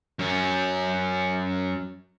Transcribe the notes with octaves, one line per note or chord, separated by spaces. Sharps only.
F#2 C#4